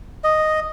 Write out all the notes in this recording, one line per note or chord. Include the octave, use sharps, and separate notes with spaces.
D#5